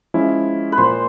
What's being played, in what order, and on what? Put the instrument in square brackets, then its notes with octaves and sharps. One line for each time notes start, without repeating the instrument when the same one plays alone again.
[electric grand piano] F3 G#3 C#4 E4
[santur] B4
[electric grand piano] A#2 F3 A#3 [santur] C5